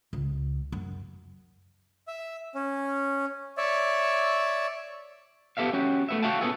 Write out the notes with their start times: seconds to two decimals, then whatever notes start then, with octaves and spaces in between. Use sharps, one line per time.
0.13 C#2
0.72 F#2
2.08 E5
2.55 C#4
3.57 C#5 D5 E5
5.57 B3 G4 A4 E5 F5
5.73 C#4 F#4 G4
6.09 A3 B3 E5
6.22 F#4 E5 F5 G5 A5
6.41 A#2 B3 C#4 G#4 A4